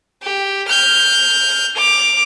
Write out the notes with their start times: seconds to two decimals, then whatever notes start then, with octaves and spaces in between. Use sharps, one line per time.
0.23 G4
0.69 F6 G6
1.77 D6 F7